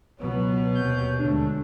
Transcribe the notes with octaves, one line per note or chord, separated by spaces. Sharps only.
C#2 B2 F#3 B3 C#5
D#2 C3 G6
D2 G#3 A3 D4